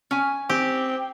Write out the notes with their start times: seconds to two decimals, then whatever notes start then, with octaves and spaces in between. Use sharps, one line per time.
0.11 C#4 G#5
0.49 C4 G4